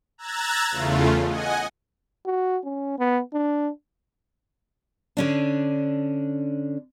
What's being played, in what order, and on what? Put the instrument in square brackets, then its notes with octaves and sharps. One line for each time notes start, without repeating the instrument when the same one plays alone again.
[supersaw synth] A#5 E6 F#6 G#6 A6
E2 C#3 A3 F4
D#5 F#5 G#5
[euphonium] F#4
C#4
B3
D4
[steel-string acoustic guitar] D3 C#4 D4